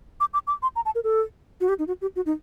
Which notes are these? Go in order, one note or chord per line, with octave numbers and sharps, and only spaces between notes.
D6
D6
D6
C6
A#5
A5
A#4
A4
F#4
G4
D#4
F#4
G4
F#4
D#4